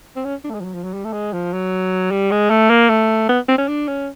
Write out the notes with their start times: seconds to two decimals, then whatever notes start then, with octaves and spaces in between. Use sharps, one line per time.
0.16 C4
0.25 C#4
0.45 D4
0.50 A3
0.54 G#3
0.60 F3
0.64 F#3
0.74 F3
0.84 F#3
0.94 G3
1.05 A3
1.13 G#3
1.33 F3
1.53 F#3
2.11 G3
2.31 G#3
2.50 A3
2.70 A#3
2.90 A3
3.29 B3
3.49 C4
3.58 C#4
3.68 D4
3.88 C#4